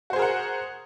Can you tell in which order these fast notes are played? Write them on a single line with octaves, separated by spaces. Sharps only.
F#4 C5 G#4 A#4 F#5